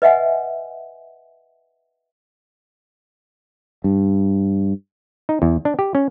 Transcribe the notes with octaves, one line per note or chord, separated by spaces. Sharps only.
B4 D#5 E5 F#5 G#5
G2
D#4
E2
D4
G4
C#4